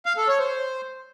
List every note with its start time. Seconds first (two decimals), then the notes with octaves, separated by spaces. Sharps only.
0.06 F5
0.17 A4
0.28 C#5
0.39 C5